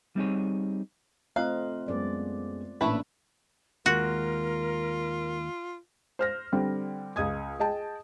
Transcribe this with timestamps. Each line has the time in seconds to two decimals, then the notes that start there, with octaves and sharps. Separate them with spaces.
0.16 G3 C4 D#4 G#4 C#5
1.36 A3 C4 F4 D#5 F5 A#5 F#6
1.88 F#2 G#3 B3 D5
2.81 A1 A#2 A3 D4 E4 B4
3.86 D#2 G#3 F4 F#4 A#4
6.19 C5 F6 A#6
6.52 D3 G3 C4
7.16 C#2 D#5 D#6 G#6
7.60 G#4 D#5 G5 A5